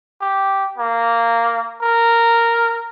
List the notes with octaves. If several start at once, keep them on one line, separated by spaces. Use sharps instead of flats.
G4
A#3
A#4